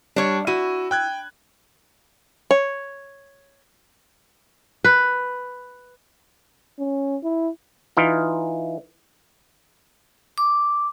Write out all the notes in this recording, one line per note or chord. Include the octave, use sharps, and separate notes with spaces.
G3 D4 C#5
E4 F#4 D#7
G5 F#6 G#6
C#5
B4
C#4
E4
E3 D#4 F4
D6